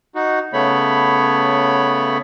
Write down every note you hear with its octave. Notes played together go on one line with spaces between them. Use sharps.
D#4 F#4
C#3 A3 B3 C#5 B5